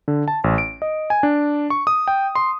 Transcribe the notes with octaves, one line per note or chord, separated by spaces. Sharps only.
D3
A5
A1
D7
D#5
G#5
D4
C#6
D#6
G5
C6